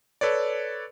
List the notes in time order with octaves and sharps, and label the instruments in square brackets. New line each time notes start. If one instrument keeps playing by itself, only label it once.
[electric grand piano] A4 B4 C#5 D5